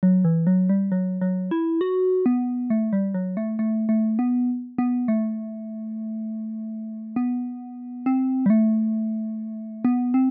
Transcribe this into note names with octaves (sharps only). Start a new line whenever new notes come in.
F#3
E3
F#3
G3
F#3
F#3
E4
F#4
B3
A3
G3
F#3
A3
A3
A3
B3
B3
A3
B3
C4
G3
A3
B3
C4